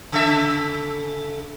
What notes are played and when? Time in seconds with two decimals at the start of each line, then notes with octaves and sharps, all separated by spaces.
0.12 C#3 A4 E5